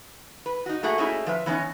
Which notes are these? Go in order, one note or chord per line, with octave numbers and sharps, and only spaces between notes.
B4
D#4 F#4
A3 A#3 F#4 G#4 F#5
A3 A#3 C#4 D#4 E4 G#4
F3 B4 E5
E3 B3 C#4 D#4